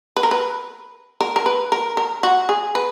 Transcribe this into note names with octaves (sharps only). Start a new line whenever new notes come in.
B4
A#4
B4
A#4
A#4
B4
A#4
A#4
F#4
G#4
B4